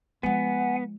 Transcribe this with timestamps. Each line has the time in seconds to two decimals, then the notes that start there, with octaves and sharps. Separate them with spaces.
0.23 F3 G#3 B3 F#5 G#5